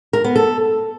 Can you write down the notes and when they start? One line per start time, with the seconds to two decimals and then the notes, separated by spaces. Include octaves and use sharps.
0.13 A#4
0.24 B3
0.36 A4